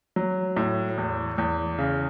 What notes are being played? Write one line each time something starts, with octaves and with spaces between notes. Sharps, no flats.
F#3
A2
E2
E2
C#3